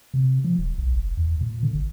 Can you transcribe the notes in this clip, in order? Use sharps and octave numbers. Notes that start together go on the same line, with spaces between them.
C3
F3
D#1
B1
F1
E2
A#2
D3
G#1